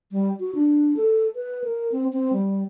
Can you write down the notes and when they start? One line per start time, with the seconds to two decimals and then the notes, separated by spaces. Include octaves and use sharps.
0.11 G3
0.40 F#4
0.55 D4
0.97 A4
1.35 B4
1.64 A#4
1.92 C4
2.13 C4
2.33 G3